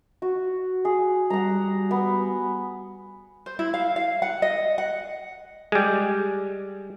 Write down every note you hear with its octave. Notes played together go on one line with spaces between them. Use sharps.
F#4
G#4
G3 F#5 A#5
B3
C5
E4
F5
F5
F#5
D#5
F#5
G3 G#3